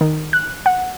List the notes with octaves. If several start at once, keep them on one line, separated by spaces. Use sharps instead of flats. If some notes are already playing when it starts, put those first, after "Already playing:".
D#3
F#6
F#5